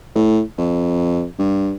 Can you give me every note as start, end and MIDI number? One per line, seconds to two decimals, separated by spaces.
0.15 0.41 45
0.58 1.25 41
1.38 1.75 43